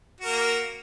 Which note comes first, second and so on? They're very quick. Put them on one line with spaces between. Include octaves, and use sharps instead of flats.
F#4 A#4 A#3